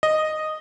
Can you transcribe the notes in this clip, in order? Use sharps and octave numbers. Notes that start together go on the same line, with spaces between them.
D#5